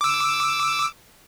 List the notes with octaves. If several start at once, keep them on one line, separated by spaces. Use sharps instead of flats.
D6 E6